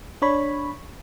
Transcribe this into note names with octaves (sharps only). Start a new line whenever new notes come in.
D4 C#5 B5